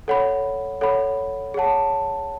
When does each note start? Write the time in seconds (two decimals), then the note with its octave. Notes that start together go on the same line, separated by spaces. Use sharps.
0.08 A4 C#5 F#5 B5
0.81 A4 C#5 F#5 B5
1.54 G#4 C#5 F#5 A5